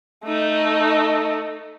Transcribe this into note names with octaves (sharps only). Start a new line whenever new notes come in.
A3 D#4